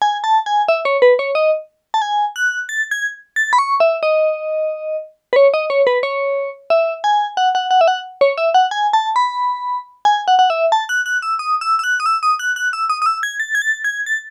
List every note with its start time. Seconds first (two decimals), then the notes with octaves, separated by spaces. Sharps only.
0.02 G#5
0.24 A5
0.46 G#5
0.68 E5
0.85 C#5
1.02 B4
1.19 C#5
1.35 D#5
1.94 A5
2.02 G#5
2.36 F#6
2.69 A6
2.91 G#6
3.36 A6
3.53 B5
3.59 C#6
3.80 E5
4.03 D#5
5.33 B4
5.36 C#5
5.54 D#5
5.70 C#5
5.87 B4
6.03 C#5
6.70 E5
7.04 G#5
7.37 F#5
7.55 F#5
7.71 F#5
7.81 E5
7.88 F#5
8.21 C#5
8.38 E5
8.54 F#5
8.71 G#5
8.93 A5
9.16 B5
10.05 G#5
10.28 F#5
10.39 F#5
10.50 E5
10.72 A5
10.89 F#6
11.06 F#6
11.22 E6
11.39 D#6
11.61 E6
11.79 E6
11.84 F#6
12.00 D#6
12.06 E6
12.23 D#6
12.39 F#6
12.56 F#6
12.73 E6
12.90 D#6
13.02 D#6
13.06 E6
13.23 G#6
13.40 A6
13.55 G#6
13.62 A6
13.84 G#6
14.06 A6